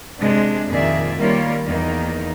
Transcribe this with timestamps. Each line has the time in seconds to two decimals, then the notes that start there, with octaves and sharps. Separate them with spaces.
0.19 C3 G#3 D4
0.68 F2 A#2 D#3 G#4 D5 E5
1.17 D#3 G3 A#3 F4 C#5
1.65 E2 D#3 A#3 D#4